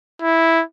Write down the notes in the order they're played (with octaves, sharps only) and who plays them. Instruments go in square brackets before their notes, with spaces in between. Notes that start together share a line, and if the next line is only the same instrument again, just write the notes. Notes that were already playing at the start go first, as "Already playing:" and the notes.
[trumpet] E4